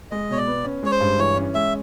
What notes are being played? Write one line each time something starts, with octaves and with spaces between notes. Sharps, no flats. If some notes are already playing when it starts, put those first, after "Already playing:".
G#3 D#5
B2 C#5
D5
B3
C#4
G#3 C#5
C5
G2
E3 C#5
C#4
G#3 E5